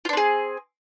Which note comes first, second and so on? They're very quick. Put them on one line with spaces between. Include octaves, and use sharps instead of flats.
F4 D4 C4 G#4